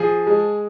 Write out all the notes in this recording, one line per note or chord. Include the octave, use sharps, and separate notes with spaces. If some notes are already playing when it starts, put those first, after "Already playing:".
Already playing: F3 G#4
G#3